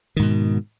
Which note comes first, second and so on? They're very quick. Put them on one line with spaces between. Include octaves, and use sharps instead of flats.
D#3 G#2 B2